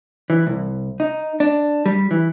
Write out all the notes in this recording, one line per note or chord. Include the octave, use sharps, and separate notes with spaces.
E3
C2
D#4
D4
G3
E3